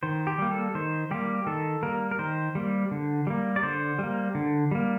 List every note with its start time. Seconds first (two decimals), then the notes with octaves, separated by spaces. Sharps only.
0.03 D#3 C5
0.27 G4
0.39 G3 A#3
0.51 A4
0.75 D#3 C5
1.11 G3 A#3 G4
1.47 D#3 A4
1.83 G3 A#3 A#4
2.11 A#4
2.19 D#3 C5
2.55 G3 A#3
2.91 D3
3.27 G3 A#3
3.56 D5
3.63 D3 C5
3.99 G3 A#3
4.35 D3
4.71 G3 A#3